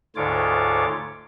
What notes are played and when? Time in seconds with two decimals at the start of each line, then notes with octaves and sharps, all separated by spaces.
0.16 D2 G#2 D3 F4 C#5 D6